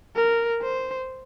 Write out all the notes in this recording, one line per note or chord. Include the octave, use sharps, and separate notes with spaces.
A#4
C5